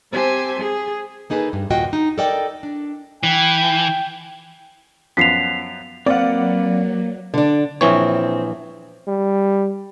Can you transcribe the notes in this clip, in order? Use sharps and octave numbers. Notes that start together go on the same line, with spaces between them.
C4 G4 C5 E5 G#5 A5
G#4
A#3 D#4 G#4 A4 B4
G2
D#2 A#2 F4 F#4 D#5 G5
D#4
A4 A#4 D5 D#5 G5
D4
E3 G5
F#2 F3 B3 B6 C7 F7
F#3 A#3 C4 B4 D5 F5 F#5
D3 D4
A#1 E3 C4 C#5
G3